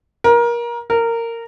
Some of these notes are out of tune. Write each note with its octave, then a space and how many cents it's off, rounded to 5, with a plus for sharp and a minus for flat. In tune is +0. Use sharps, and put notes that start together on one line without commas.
A#4 +25
A#4 -15